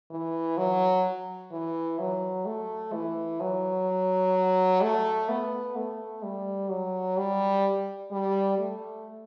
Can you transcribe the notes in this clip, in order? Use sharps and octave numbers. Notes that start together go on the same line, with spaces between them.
E3
F#3
E3
F#3
A3
E3
F#3
A3
B3
A3
G3
F#3
G3
G3
A3